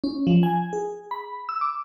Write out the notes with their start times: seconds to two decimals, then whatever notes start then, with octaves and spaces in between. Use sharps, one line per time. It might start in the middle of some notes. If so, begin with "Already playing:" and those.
0.04 C#4
0.27 F3
0.43 G#5
0.73 G#4
1.11 B5
1.49 E6
1.61 D6